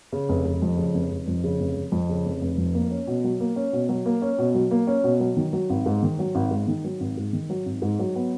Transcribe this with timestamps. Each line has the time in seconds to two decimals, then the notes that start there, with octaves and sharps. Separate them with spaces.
0.12 C#3
0.29 F1
0.45 F1
0.62 F2
0.78 C#3
0.94 F1
1.11 F1
1.28 F2
1.44 C#3
1.60 F1
1.77 F1
1.92 F2
2.09 C#3
2.25 F1
2.41 F1
2.58 F2
2.74 A#3
2.91 C#4
3.07 B2
3.24 F#3
3.40 A#3
3.56 C#4
3.73 B2
3.89 F#3
4.06 A#3
4.22 C#4
4.39 B2
4.55 F#3
4.71 A#3
4.87 C#4
5.04 B2
5.20 F#3
5.37 D#3
5.53 F#3
5.70 G#1
5.86 G#2
6.03 D#3
6.19 F#3
6.35 G#1
6.51 G#2
6.67 D#3
6.85 F#3
7.00 G#1
7.17 G#2
7.33 D#3
7.50 F#3
7.65 G#1
7.82 G#2
7.99 F#3
8.15 B3